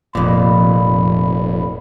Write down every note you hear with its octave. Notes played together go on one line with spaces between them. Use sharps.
F1 F2 A#2 B5